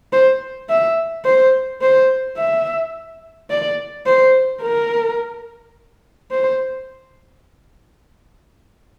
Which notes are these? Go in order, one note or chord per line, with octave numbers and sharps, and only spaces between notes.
C5
E5
C5
C5
E5
D5
C5
A#4
C5